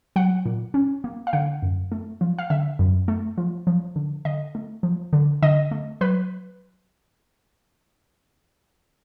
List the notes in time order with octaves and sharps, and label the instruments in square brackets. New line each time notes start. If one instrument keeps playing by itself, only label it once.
[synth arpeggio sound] F#3 F#5
A#2
C#4
A#3
F5
D3 F#5
F#2
A3
F3
F5
D3 E5
F#2
A3
F3
F3
D3
D3 D#5
A3
F3
D3
D3 D#5
A3
F#3 B4